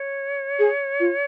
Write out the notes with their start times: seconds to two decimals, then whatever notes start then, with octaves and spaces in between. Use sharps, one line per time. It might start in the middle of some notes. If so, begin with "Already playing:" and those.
Already playing: C#5
0.59 G#4
1.00 F4